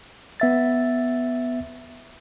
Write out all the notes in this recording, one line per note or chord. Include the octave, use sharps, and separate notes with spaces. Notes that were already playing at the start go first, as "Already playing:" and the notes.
B3 E5 A6